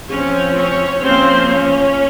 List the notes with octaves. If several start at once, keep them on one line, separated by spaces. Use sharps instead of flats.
F3 C4 C#4 C#5
C#4 C#5
F3 A#3 C4 C#4 C5
C#4 C#5